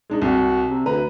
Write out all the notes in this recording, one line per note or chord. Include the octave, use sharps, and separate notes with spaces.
G#3 D4 D#4
C2 F#4
C3
D2 B4 A#5